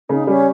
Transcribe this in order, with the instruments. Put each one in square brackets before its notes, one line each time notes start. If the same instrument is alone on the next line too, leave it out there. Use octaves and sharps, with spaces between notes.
[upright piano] C#3 [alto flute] D#4
[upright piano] G3 [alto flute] C#4